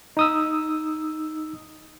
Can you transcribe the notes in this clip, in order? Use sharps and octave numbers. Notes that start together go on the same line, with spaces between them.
D#4 D#6 E6